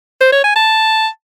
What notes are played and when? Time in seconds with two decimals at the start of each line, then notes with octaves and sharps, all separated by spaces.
0.21 C5
0.33 C#5
0.44 G#5
0.56 A5